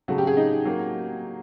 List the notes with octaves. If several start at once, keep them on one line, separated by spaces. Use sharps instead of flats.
C#3 F#3 A3 F#4
G4
G#4
D#4
F#3 A#3